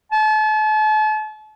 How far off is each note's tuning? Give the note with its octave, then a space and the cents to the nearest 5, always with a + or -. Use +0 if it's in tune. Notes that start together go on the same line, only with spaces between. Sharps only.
A5 -40